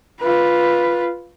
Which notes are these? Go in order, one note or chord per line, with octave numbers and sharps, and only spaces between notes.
F4 B4